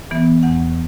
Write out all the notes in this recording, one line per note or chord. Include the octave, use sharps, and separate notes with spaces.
E3 B3
E2 F#5